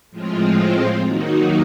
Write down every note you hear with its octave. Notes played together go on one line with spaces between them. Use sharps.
A2 F3 G#3 C4 F4
D#3 F#3 A#3 D#4 F#4